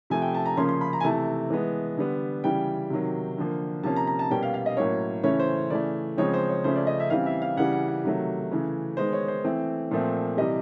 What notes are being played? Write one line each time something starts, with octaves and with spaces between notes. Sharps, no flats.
C3 F3 A3 G#5
G5
A5
A#5
C#3 F3 A#3 C#4 C6
C6
B5
A#5
G#5
C3 E3 A3 A5
E3 G#3 B3
D3 G3 B3
C#3 E3 G3 G5
C3 D#3 F#3
D3 F3 A#3
C3 F3 A#3 C#4 A5
A#5
A#5
A5
B2 G3 A#3 C#4 G5
F5
F5
D#5
A2 F#3 A#3 C#4 C#5
C#3 E3 A3 C#4 C#5
C5
C#3 E3 A3 D5
C#3 F3 G#3 C4 C#5
C5
C#5
C#3 F3 A3 C#4 C5
D5
D#5
E5
C#3 E3 G3 C4 F5
E5
F5
C#3 E3 G3 F#5
F#5
F#5
C3 D#3 F#3 A3
C#3 E3 A3
D#3 G#3 B3 C5
C#5
C5
E3 A3 C4
A#2 F3 A3 C4
C3 E3 G3 D#5